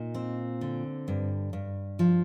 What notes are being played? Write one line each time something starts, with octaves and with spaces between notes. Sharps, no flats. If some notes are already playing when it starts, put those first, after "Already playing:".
Already playing: A#2 D#4
C4
D3
G2
G2
F3